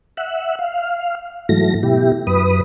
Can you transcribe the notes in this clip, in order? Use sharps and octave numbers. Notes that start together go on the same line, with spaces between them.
E5 F#5
F5
G#2 E3 F#3 A3 A#6
B2 E4 G4
F#2 B4 D#6